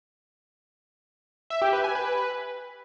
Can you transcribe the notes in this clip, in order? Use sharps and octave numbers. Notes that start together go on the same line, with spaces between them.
E5
G4
B4
G#5
B4